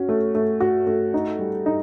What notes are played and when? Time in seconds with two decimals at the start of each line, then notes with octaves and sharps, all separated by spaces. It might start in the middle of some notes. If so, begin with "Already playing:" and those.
Already playing: C#4 F#4
0.09 A3
0.35 A3
0.60 F#4
0.87 A3
1.14 D#4
1.39 G3
1.66 D#4